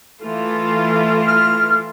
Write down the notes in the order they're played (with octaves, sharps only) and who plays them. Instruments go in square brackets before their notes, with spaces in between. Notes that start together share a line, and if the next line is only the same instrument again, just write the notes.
[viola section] E3 A3 F4
[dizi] F6